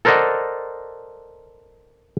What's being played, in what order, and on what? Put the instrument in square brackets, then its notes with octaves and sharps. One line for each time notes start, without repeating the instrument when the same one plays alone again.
[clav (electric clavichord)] A4 A#4 C5 D5 D#5 F#5